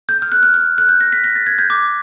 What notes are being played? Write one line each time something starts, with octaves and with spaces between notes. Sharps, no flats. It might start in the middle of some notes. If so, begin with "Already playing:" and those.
G6
F6
F#6
F6
F6
F#6
G6
A#6
B6
A#6
A6
G#6
G6
D6